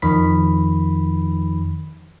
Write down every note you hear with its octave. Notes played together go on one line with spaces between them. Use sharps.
F2 D#3 F3 B5 B6